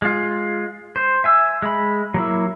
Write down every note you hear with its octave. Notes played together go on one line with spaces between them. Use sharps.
G#3 F4
C5
E5 G#5 E6
G#3 B5
F#3 A#3 E4